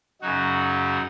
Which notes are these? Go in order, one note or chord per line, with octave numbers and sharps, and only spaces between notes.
F#2 C#3 F#3 D#4 F#4